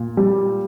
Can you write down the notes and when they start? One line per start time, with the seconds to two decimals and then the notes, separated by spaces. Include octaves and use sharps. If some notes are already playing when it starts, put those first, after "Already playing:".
Already playing: A#2
0.17 G3